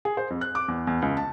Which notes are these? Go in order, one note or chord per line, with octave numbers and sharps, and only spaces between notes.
G#4
C5
F2
F#6
D6
E2
E2
C#2
A5